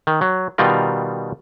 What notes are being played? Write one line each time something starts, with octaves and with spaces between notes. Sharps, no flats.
D#3
F#3
B2 D#3 G3 F4 A#4